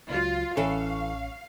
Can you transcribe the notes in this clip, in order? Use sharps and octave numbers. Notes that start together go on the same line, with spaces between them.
C#2 F#3 F4
A1 E3 C#4 A4 F5 C#6